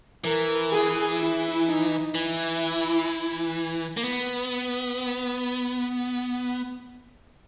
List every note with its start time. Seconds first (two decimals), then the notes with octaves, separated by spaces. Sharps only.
0.24 E3 A#4
0.73 G#4
1.21 E4
1.67 D#4
2.15 E3 E4
3.97 A#3
4.04 B3